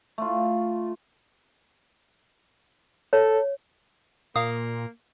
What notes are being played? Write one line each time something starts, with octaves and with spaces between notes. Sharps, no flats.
A3 F4
A4 C#5
A#2 A#3 F5 D#6